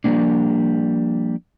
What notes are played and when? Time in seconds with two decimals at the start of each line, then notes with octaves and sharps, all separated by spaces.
0.04 F3 G3 G#3 A#3 D4